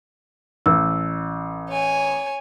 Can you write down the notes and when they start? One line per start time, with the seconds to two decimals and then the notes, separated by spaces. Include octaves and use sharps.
0.66 A1 E6
1.70 C#5 G#5